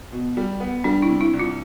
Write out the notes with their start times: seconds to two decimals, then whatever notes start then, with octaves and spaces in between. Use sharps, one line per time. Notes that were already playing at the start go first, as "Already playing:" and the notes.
0.12 B2
0.37 G3
0.60 B3
0.84 G3 D4
1.02 E4
1.09 C3
1.21 E4
1.33 C2
1.40 F4